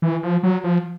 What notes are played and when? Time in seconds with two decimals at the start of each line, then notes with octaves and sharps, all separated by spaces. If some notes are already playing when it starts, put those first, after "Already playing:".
0.02 E3
0.23 F3
0.43 F#3
0.64 F3